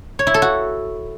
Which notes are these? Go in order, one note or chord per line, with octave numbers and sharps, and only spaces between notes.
C#5
E4
A4
F#4